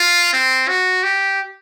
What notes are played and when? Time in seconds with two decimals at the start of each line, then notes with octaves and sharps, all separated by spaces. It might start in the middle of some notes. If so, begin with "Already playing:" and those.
Already playing: F4
0.33 C4
0.68 F#4
1.03 G4